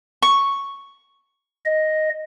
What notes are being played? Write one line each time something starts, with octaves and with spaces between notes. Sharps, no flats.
C#6
D#5